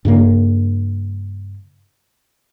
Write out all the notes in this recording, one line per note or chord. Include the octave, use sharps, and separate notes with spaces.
G2 C#3 A#3